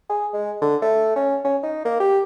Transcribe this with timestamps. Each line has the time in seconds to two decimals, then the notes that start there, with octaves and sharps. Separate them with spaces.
0.09 G#4
0.33 G#3
0.62 D3
0.82 A3
1.16 C#4
1.44 C#4
1.63 D#4
1.85 A#3
2.00 G4